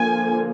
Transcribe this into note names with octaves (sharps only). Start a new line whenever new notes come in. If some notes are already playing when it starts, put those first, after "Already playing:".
Already playing: D3 F3 A#3 G#5